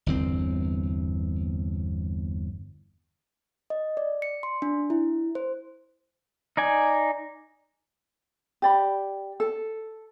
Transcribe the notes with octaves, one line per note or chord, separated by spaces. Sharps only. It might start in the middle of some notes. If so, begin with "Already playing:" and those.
G1 E2 C4
D#5
D5
C#7
C6
D4
E4
C5
D#4 D5 G#5
G4 D5 B5
A4